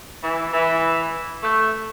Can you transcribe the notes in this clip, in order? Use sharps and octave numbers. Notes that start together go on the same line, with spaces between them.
E3
E3
A3